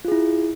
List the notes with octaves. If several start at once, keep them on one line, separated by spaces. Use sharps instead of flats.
E4 F4 G#4